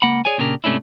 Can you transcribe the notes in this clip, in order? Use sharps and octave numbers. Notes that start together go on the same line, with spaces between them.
C#2 A#3 F#5 B5
G#4 C#5 D5 G#5
A#2 C#3 D4 G4 A#4
G#2 C3 A3 C#4 D4 E4